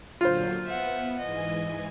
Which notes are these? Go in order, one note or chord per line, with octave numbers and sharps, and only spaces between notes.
A#2 D3 F#3 F4 C5
B3 E5 F#5
G#2 E3 D#5 G#5